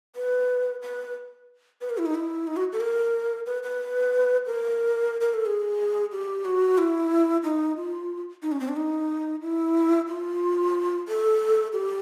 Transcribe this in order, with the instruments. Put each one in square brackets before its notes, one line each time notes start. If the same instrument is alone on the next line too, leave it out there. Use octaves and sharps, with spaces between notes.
[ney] B4
B4
B4
A#4
E4
D#4
E4
D#4
F#4
A4
A#4
B4
B4
A#4
A#4
A4
G#4
G4
F#4
E4
D#4
F4
D#4
C#4
C4
D4
D#4
E4
F4
A4
G4